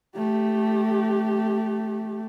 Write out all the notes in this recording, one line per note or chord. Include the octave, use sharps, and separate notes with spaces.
A3 G4